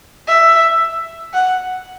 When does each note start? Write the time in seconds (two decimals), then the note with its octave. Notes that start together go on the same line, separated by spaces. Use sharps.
0.28 E5
1.34 F#5